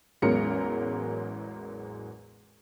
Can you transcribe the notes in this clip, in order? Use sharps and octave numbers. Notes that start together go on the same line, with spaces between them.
A1 E2 F#3 G#3 A#4 C#7